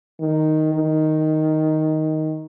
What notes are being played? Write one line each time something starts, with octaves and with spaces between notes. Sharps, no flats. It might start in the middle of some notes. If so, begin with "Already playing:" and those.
D#3
D#3